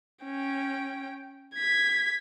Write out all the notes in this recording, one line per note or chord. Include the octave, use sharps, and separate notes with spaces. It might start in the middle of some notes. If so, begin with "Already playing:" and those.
C#4 G5
G#6 B6